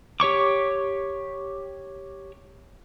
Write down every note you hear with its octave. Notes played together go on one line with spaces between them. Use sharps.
G4 C#5 C#6 D6